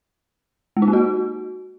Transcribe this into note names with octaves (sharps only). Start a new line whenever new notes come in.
G#3
D#4
A#3
F#4